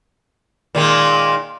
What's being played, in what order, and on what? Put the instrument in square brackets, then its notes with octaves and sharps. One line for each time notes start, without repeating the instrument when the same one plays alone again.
[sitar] A#2 D#3 G#3